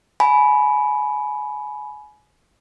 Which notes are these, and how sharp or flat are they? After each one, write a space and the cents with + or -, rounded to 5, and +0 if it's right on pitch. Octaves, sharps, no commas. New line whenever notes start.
G#5 +25 B5 -5